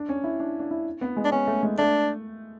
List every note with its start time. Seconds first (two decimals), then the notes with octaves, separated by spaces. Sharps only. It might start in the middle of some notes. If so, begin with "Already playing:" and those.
Already playing: D4
0.09 C#4
0.24 E4
0.40 D4
0.59 D4
0.71 E4
1.01 B3
1.16 G#3
1.25 D4
1.32 B3 C#4
1.47 A3
1.63 G#3
1.78 A3 D4